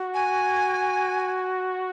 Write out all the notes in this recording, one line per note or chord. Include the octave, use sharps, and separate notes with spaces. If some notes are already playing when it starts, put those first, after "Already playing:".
Already playing: F#4
G#5